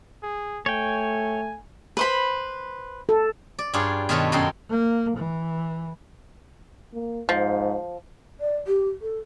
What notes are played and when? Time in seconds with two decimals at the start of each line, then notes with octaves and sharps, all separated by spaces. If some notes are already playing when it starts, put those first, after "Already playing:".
0.23 G#4
0.66 A3 C#5 G5 G#5
1.97 B4 C5 B5
3.09 A4
3.59 D5
3.74 G2 F4 G#4 C#5 D5
4.09 B2 D#3 F4 A4 B4 C#5
4.32 F#2 F#3 D#4 A4 G5 C6
4.70 A#3
5.17 E3
6.94 A#3
7.29 G#2 F3
8.40 D5
8.67 G4
9.01 A4